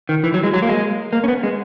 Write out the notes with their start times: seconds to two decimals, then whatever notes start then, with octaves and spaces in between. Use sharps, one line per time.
0.09 D#3
0.24 E3
0.34 F#3
0.44 G#3
0.54 F#3
0.62 A#3
0.69 G#3
1.13 A#3
1.24 C#4
1.28 B3
1.43 G#3